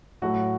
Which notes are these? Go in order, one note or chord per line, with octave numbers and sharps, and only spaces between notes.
A2 F#3 A3 F#4